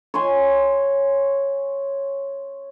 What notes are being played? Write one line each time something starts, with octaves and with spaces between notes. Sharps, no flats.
C#5 G#5 C6